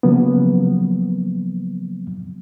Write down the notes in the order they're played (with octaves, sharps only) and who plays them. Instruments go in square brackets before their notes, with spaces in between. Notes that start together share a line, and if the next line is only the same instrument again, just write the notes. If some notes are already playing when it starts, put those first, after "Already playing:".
[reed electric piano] C#3 F3 F#3 A#3 B3